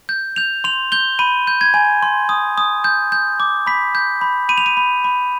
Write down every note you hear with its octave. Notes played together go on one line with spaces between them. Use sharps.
G6
G6 F7
C6 F7
G6 G7
B5 D#7
G6
G#6
G#5
C6
D#6
D#6
G6
G6
D6
B5 B6
G6
B5
B5 D#7
F7
D#7
B5
B5